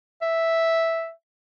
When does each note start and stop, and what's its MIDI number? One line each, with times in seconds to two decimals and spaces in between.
0.22 1.11 76